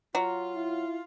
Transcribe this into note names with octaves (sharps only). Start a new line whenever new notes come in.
F#3 F4
E4